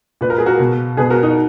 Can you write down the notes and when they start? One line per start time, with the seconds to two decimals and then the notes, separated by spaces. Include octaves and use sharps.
0.21 A#2 B4
0.30 A#4
0.38 G#4
0.46 F#4 A#4
0.59 B2
0.97 B2 G#4 B4
1.10 F#4 A#4
1.23 D#4 F#4